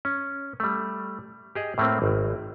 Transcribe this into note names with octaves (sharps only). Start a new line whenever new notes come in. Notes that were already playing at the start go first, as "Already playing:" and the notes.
C#4
G3 A3
G4 G#4 D#5
A2 A3 A#3 C4
G#1